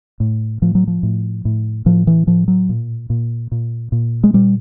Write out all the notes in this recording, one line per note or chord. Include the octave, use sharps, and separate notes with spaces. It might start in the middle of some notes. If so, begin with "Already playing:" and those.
A2
A2 F3
F#3
F3
A2
A2
A2 F3
E3
A2 F3
F#3
A#2
A#2
A#2
A#2
G#3
A#2 G3